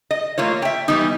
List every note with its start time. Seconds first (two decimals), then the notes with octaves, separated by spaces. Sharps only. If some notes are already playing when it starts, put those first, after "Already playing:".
0.11 D#5
0.38 A3 A#3 F4 C#5
0.62 E5 G5
0.88 E3 G3 B3 D#4